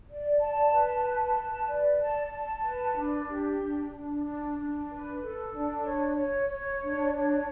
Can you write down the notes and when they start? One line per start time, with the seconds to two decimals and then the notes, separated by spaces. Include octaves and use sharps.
0.08 D5
0.40 A5
0.71 B4
1.03 A5
1.35 B4
1.68 D5
2.00 A5
2.32 A5
2.64 B4
2.96 D4
3.27 G4
3.60 D4
3.92 D4
4.24 D4
4.57 D4
4.89 B4
5.21 A4
5.52 D4
5.84 C#5
6.16 C#5
6.49 C#5
6.81 D4
7.13 C#5